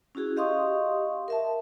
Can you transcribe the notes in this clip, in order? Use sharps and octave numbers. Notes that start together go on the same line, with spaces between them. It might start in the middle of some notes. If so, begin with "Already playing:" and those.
C#4 E4 F#4 G#4
G4 D#5 F5 C6 C#6 D#6
A#4 E5 A5